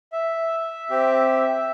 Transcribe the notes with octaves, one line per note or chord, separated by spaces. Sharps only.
E5
C4 G4